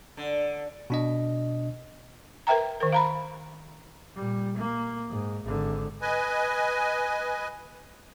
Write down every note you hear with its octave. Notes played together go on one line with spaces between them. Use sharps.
D3
B2 D4 D#5
A#4 B4 E5 G5 A#5
D#3 A#4
F5 A#5 B5
A#2 G3
A#3
G#2
G#1 D3
B4 D#5 G#5